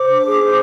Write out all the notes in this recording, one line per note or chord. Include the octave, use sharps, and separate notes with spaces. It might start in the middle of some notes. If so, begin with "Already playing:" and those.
Already playing: C5 D6
D4
G#4
C5